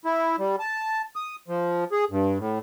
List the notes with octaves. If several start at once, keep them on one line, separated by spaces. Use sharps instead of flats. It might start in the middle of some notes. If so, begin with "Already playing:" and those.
E4
G3
A5
D#6
F3
G#4
G2
A2